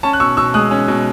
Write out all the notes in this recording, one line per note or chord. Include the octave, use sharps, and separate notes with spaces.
C#4 A5 C#6
F#6
B2 C#6 E6
B2 C#6 E6
G#3 D#6 F#6
C#4
B2